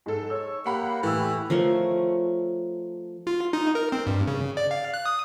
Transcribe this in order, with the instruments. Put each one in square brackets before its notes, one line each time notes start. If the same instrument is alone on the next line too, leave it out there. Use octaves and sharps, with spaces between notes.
[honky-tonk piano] G#2 A4
[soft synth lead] C#5 [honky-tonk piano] E6
[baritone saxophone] A#3 [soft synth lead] G4 [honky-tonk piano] F#5 B5
[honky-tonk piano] A2 E6 [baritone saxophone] E3
[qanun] F3 A3 A#4 C#5
[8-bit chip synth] F4
D#4
A#4
C4
G2
C#3
D5
F5
F#6
D#6